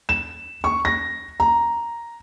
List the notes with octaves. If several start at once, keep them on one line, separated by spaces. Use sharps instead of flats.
E7
C#6
A#6
A#5